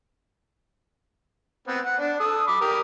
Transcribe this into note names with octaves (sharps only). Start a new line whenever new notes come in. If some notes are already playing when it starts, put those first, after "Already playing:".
B3 C4
F#5
D4
A4 D#6
B5 D6
G4 A#4 D#6